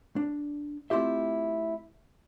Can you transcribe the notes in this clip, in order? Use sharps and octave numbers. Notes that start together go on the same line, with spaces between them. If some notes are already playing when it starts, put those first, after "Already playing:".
D4
A3 C4 E4 F4 G4 E5